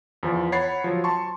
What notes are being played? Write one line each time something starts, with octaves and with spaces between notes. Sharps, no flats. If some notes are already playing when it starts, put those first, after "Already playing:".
E2 F3
C#5 F#5 B5 A6 C7 C#7
F3 F#3
A5 C6 C#6